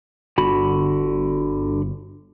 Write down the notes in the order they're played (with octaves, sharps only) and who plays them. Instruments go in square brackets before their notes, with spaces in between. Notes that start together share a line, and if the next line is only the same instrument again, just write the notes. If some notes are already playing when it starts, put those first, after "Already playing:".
[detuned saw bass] G1 [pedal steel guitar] D3 F#4 B5